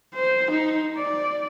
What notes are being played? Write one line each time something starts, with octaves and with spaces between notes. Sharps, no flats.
C5
D#4
D5